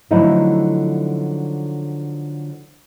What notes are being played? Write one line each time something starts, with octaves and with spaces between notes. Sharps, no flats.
D3 F3 F#3 A3 D#4 E4